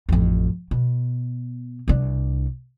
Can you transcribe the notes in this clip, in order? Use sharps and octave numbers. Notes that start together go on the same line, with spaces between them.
A1 F2
B2
C2 D4